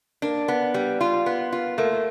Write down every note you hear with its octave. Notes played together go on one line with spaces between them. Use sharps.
A#3 D4
B3
G3
F4
B3
F4
A3 A#3